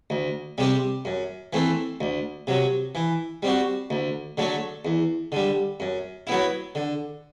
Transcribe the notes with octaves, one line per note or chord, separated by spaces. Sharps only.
D2
C3 G3 C4 G4
F#2
E3 A3 C4
D2
C3 F#3
E3
G3 C4 F#4
D2
D3 F#3 A3
E2
D3 G3
F#2
F#3 B3 E4
D3